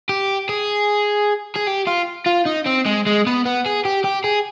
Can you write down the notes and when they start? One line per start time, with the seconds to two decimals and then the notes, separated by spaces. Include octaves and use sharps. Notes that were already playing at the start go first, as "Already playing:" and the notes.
0.09 G4
0.49 G#4
1.56 G#4
1.67 G4
1.87 F4
2.27 F4
2.46 D#4
2.66 C4
2.86 G#3
3.06 G#3
3.27 B3
3.45 B3
3.66 G#4
3.85 G4
4.05 G4
4.24 G#4